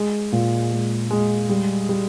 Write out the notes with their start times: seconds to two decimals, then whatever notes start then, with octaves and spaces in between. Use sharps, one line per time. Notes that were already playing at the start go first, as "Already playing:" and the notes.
Already playing: G#3
0.32 A#2
0.72 G#3
1.11 G#3
1.49 G3
1.89 G3